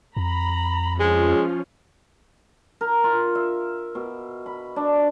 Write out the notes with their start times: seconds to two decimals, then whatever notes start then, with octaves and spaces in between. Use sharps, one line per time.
0.17 F2 A#5 B5
1.00 F3 G#3 C#4 F4
2.81 A#4
3.04 F4
3.35 E5
3.95 B2
4.46 B5
4.76 D4